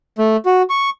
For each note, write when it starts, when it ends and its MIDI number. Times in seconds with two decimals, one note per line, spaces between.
0.18 0.37 57
0.46 0.62 66
0.70 0.90 85